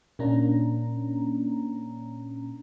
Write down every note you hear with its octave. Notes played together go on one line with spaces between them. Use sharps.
A#2 A#3 C#4 D4 A#5